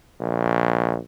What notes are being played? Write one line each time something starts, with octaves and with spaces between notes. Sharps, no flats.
A#1